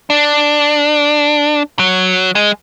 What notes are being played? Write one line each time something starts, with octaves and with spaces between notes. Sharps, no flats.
D4
F#3
G#3